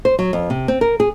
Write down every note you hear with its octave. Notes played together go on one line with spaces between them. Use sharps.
C5
F#3
F2
C3
C4
A#4
G#4